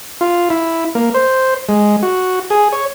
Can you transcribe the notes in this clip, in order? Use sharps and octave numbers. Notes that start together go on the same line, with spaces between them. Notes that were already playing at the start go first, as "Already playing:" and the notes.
F4
E4
A#3
C5
G#3
F#4
G#4
C#5